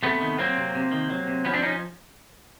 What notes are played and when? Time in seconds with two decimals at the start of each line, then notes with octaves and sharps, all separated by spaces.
0.03 C3 A3 B3
0.21 D#3
0.39 F#3 A#3 C4
0.57 C3
0.75 C3
0.92 D#3
1.10 F#3
1.27 C3
1.45 F3 B3 C#4
1.54 C4 D4
1.63 F3 C#4 D#4